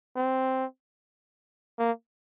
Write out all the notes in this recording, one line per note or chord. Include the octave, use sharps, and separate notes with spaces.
C4
A#3